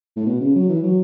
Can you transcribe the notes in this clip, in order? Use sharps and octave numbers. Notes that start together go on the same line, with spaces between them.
A2
B2
C#3
F#3
E3
F#3